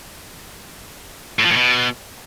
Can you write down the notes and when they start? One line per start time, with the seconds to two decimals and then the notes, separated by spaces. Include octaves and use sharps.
1.39 A2
1.45 F3
1.51 A2
1.56 B2